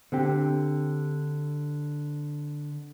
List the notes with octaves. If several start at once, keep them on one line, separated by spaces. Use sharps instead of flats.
D3 C4 G4